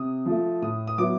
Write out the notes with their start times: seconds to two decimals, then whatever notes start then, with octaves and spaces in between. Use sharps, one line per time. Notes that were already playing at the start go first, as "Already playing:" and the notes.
Already playing: C3 D#6
0.26 F3 A3
0.62 A2 D#6
0.87 D#6
0.98 F#3 B3 E4 D6